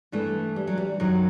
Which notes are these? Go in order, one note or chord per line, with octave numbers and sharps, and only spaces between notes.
G2 E3 A3
G3
F#3
G3
F#2 D#3 F#3